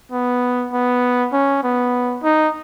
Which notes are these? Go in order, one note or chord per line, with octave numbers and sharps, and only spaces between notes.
B3
B3
C#4
B3
D#4